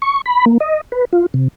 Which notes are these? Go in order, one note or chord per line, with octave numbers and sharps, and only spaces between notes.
C#6
B5
A#3
D#5
B4
F4
C3